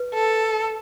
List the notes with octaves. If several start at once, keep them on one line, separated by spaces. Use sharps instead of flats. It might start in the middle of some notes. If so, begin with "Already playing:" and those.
Already playing: B4
A4